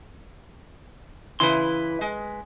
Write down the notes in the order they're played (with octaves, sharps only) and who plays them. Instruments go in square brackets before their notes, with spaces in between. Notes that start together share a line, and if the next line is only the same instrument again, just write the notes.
[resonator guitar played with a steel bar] C#3 E3 E4 [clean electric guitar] B4 C6
[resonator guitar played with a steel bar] G#3